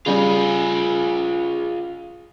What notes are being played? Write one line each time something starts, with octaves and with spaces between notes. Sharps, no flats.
C#3 G3 F4 G#4